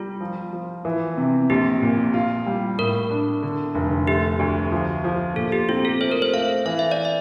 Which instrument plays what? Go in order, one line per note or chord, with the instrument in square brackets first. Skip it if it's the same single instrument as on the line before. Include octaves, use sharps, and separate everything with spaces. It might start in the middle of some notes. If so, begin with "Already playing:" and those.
Already playing: [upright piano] G3 [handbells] F4
[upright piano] F3
F3
E3
C3
[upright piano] A#1 [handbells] G4
[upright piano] A#2
F4
G3
[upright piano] A2 [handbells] A#4
[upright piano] D4
D3
F1
[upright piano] A3 [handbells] G4
[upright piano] D2
F3
F3
[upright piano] A#2 [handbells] A4
[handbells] G4
[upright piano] C4 [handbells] F4
[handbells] A4
[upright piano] A3 [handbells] C5
[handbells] A#4
C5
[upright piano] A3 [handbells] F5
[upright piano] E3 [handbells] F5
[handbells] E5
D5
E5